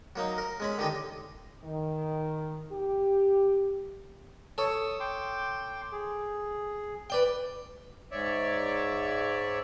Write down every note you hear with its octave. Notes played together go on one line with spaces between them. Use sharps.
F#3 A#3 D#4
A#4
G#3 C#4 B5
D3 D#3 G4 A4 D#5
D#3
G4
A4 C#5 D#6
G5 C6 D6
G#4
B4 D5 G5
G#2 C#5 D5 E5